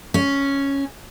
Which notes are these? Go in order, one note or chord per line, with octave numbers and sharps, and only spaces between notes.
C#4